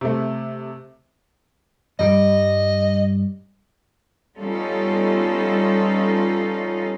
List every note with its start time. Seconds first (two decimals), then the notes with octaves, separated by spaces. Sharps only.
0.01 C3 A3
1.99 G2 G3 D#5
4.38 G3 B3 C#4 D#4 F4 A4